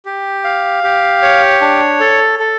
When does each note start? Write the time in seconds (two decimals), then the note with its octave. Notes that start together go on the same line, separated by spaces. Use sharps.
0.05 G4
0.44 F5
0.83 G4
1.23 C#5
1.61 D4
2.00 A4
2.39 A4